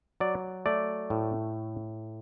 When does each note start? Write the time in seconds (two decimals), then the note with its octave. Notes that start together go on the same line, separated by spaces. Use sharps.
0.20 F#3 D5
0.66 A3 D5
1.10 A2